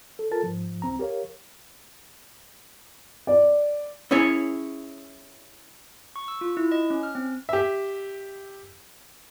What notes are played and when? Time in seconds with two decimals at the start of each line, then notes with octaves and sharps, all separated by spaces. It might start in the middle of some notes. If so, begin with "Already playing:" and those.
0.19 A4
0.31 F4 A4 A#4 A5 A6
0.43 G#2 F3
0.82 C2 C4 A#5
0.99 G4 A#4 C#5 F5
3.27 D5
4.11 C#4 E4 G#4 C#5
6.16 C#6
6.28 E6
6.41 F4
6.57 E4
6.72 D#5
6.90 C#4
7.03 F6
7.15 C4
7.49 G4 E5